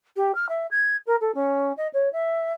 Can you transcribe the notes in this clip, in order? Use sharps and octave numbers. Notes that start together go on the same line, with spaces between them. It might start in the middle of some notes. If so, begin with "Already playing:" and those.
G4
F6
E5
G#6
A#4
A4
C#4
D#5
C#5
E5